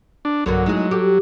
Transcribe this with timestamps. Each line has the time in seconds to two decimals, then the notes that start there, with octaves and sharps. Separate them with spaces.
0.25 D4
0.46 B1 G2 D3 F#3 A#3 B3
0.66 G#3 A3 D#4 E4 G#4
0.91 F#4 G4 A4